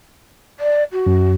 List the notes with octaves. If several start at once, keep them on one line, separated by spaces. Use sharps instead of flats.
D5
F#4
F#2